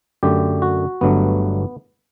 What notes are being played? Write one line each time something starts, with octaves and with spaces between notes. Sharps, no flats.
F#2 D3 A3 G4
F#4
G1 G2 F#3 A3 B3